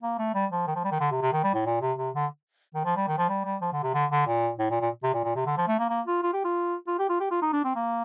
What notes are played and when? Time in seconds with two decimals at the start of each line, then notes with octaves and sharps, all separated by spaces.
0.03 A#3
0.18 A3
0.34 G3
0.52 F3
0.67 D#3
0.76 F3
0.84 G3
0.91 D#3
1.00 D3
1.11 C3
1.22 C3
1.33 D#3
1.43 G3
1.54 A2
1.66 A#2
1.81 C3
1.98 C3
2.14 D3
2.75 D#3
2.85 F3
2.96 G3
3.07 D#3
3.18 F3
3.29 G3
3.45 G3
3.61 F3
3.72 D3
3.83 C3
3.94 D3
4.11 D3
4.27 A#2
4.59 A2
4.71 A#2
4.81 A#2
5.03 C3
5.14 A#2
5.24 A#2
5.36 C3
5.46 D3
5.57 F3
5.68 A3
5.79 A#3
5.90 A#3
6.07 F4
6.23 F4
6.33 G4
6.44 F4
6.87 F4
6.99 G4
7.09 F4
7.20 G4
7.31 F4
7.42 D#4
7.53 D4
7.64 C4
7.76 A#3